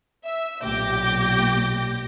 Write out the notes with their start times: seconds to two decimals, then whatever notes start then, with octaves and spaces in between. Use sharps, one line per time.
0.24 E5
0.63 B1 A#2 G4 D6 G6 A#6